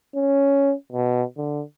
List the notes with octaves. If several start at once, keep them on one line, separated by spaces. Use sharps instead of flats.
C#4
B2
D3